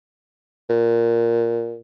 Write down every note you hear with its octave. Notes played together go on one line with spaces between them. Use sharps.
A#2